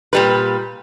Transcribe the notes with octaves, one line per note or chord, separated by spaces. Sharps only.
A#2 G3 B4